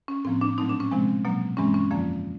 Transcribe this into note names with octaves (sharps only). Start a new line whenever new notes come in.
C#4
A2 F3 A#3 C4
D4
A#2 F#3 A3 C4 D#4
D4
C#4
C3 F3 G#3 C4
B2 F#3 A#3
G2 E3 G#3 C4 C#4
C#4
F2 D3 F3 A#3